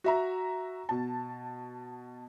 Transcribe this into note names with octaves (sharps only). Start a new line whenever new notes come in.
F#4 E5 A#5
B2 A5